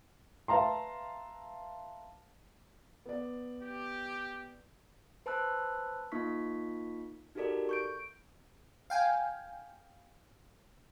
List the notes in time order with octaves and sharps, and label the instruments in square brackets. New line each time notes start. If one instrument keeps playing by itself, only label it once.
[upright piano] B4 E5 F5 A5 A#5 C6
[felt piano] B3 D5
[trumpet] G4
[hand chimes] B4 C5 A5 B5 E6 F#6
A#3 D#4 F4 C#6 B6
D#4 F#4 G4 A4 A#4 D5
C#6 G6 D7
[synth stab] F5 G5 G#5